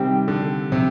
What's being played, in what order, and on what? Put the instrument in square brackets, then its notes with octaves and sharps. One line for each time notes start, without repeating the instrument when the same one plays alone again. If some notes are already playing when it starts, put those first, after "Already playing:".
Already playing: [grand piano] C3 D#3 [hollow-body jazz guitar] G3 C4 G4
[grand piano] D3
C3